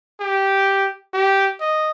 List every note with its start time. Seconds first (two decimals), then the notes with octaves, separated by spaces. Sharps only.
0.20 G4
1.14 G4
1.61 D#5